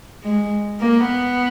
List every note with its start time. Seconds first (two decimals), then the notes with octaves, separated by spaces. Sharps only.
0.24 G#3
0.80 A#3
1.08 B3